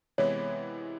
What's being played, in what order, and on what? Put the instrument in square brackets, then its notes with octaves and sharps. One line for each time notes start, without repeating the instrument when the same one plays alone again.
[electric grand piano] C3 E3 G#3 B3 E4 [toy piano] C#5